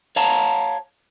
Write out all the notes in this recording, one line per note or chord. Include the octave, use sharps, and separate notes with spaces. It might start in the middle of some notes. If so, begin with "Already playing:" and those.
C#5 F5 A5 A#5